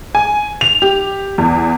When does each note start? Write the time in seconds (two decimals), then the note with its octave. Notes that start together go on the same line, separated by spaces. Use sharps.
0.15 G#5
0.61 F7
0.82 G4
1.38 E2